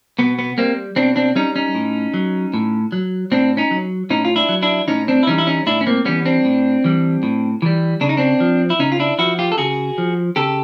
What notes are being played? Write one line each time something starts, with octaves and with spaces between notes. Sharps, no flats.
B2 B3
B3
G3 A#3 C4
B2 C4 D4
C4 D4
G3 C#4 D#4
C#4 D#4
A2
F#3
A2
F#3
A2 C4 D4
C#4 D#4
F#3
A2 C#4 D#4
F4
D4 E4
F#3
D4 E4
A2 C#4 D#4
C4 D4
E4
E3 G3 C#4 D#4
E4
C#4 D#4
A2 D4 E4
C#4
A#3 C4
E3 G3 B3 C#4
C4 D4
A2
E3 G3
A2
E3 G3
C#3 D4
D#4
C4 D4
F3
E4
C#3 C#4 D#4
F4
D4 E4
F3 E4 F#4
F4 G4
A4
C#3 F#4 G#4
F3
C#3 G4 A4